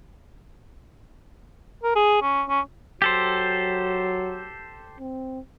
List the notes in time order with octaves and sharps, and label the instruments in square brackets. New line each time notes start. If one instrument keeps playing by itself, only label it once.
[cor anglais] A#4
G#4
C#4
C#4
[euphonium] F#3 [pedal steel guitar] G4 A4 C5
[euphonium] C4